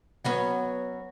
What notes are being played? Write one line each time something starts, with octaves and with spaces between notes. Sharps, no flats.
F#3 B3 C#4